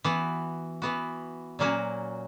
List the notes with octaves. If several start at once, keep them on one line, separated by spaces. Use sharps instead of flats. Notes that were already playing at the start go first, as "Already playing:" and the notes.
E3 B3 F#4
E3 B3 F#4
A#2 F#3 A#3 C#4 F#4